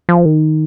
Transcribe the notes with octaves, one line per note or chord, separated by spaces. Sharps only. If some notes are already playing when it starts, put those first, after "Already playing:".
F3
D#3